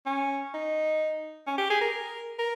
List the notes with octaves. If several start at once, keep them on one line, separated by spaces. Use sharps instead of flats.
C#4
D#4
C#4
G4
G#4
A#4
A#4